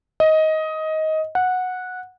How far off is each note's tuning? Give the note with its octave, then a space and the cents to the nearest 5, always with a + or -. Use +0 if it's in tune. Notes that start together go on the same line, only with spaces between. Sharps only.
D#5 +15
F#5 -10